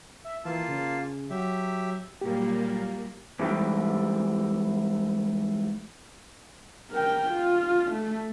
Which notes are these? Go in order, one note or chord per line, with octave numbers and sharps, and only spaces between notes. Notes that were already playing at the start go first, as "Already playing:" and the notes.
E5
E3 A#3 F4 A5
C#3
F#3 G4 E5
A#2 F#3 G3 A#3 G4
G#2 E3 G3 A3 G4
A#4 G5
F4
A3